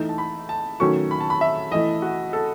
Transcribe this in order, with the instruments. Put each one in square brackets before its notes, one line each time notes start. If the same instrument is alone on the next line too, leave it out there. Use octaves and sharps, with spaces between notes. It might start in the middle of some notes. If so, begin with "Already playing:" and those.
Already playing: [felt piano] E3 A3 D#4
[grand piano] A5
B5
A5
[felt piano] D#3 F#3 A3 C#4 F#4 [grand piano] C#6
[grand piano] B5
A5
B5
E5
[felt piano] E3 A3 E4 [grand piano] D#5
[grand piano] F#4
A4